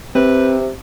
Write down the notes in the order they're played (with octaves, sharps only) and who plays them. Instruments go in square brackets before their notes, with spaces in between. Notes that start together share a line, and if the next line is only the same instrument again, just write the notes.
[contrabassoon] C3 [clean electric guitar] C4 [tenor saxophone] B4